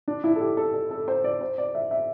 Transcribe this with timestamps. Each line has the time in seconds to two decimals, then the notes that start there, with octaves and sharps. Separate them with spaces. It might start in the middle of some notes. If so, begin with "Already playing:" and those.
0.08 D4
0.24 E4
0.36 A4
0.40 G4
0.57 A4
0.74 A4
0.91 A4
1.08 C5
1.24 D5
1.41 C5
1.58 D5
1.75 E5
1.91 E5